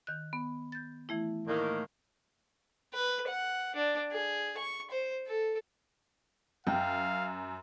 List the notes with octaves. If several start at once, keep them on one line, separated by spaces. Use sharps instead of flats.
D#3 F#6
B3
G6 A6
E3 A3 E4
A2 D#3 A#3
B4
F#5
D4
G#4
C#6
C5
A4
F#2 F5 G5